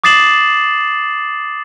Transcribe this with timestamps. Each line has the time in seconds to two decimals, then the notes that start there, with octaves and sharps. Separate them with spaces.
0.04 D6 D#6 A6 C7 E7 F#7